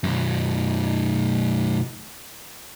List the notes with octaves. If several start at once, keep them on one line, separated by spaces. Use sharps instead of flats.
B1 F#2